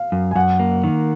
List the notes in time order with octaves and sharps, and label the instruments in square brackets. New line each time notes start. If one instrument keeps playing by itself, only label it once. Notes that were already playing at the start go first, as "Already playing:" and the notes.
Already playing: [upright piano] F5
[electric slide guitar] F#2
[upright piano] G#5
[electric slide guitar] F#2 [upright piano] F#5
[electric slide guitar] A#3
D#3